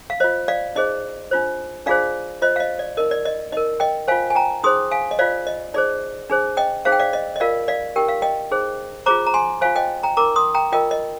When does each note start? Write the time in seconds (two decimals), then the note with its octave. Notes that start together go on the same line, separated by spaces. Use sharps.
0.10 F5
0.20 F4 C5 D#5
0.48 D5 F5
0.76 D#4 G#4 C5 D#5
1.31 D4 F4 C5
1.86 D4 F4 G#4 C5 D5 F5
2.42 F4 C5 D#5
2.56 F5
2.60 D#5
2.79 D5
2.97 D#4 A#4 D#5
3.11 D5
3.25 D#5
3.52 D#4 A#4 D#5
3.80 D#5 G5
4.08 F4 C5 F5 G#5
4.30 G#5
4.35 G5 A#5
4.63 D#4 G#4 C5 C6 D#6
4.91 F5 G#5
5.11 D#5
5.19 F4 C5 D5 F5
5.47 D#5
5.74 D#4 G#4 C5 D5
6.30 D4 G#4 C5
6.57 D#5 G5
6.85 D#4 G#4 C5 F5
6.92 G5
6.99 D5 F5
7.13 D#5
7.36 D#5
7.40 F4 A#4 D5 F5
7.68 D5 F5
7.96 D#4 G4 A#4 G5
8.08 F5
8.22 D#5 G5
8.51 D#4 G#4 C5
9.06 F4 G#4 C5 A#5 D6
9.26 A#5
9.34 G#5 C6
9.61 F4 C5 F5 G#5
9.76 D#5 G5
10.03 G5 A#5
10.17 D#4 A#4 A#5 D6
10.36 C6 D#6
10.54 G5 A#5
10.72 F4 A#4 D#5 G5
10.91 D#5